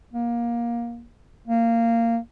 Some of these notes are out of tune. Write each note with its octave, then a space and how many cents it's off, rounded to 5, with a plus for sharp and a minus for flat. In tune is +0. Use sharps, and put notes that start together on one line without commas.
A#3 +20
A#3 -15